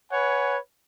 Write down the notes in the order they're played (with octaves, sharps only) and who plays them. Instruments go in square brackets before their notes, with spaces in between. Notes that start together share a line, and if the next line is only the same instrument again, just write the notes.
[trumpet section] B4 C#5 F#5 G#5